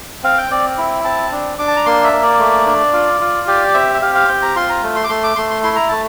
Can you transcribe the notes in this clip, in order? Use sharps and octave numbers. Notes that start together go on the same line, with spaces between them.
C4 F5
G5
C4 D5
E4
C4 A5
D4
D4 D6
A5
A#5
A#3 C6
E5
A#3
D5
A3
D4
F4
F4
G4 D5
C4 E5
E5
G4 F5
F5
C4 G5
A#5
F4 C6
A#5
A3
C6
D6
A3 C6
D6
A3 C6
C6
E4 C6
A#5
A3 A5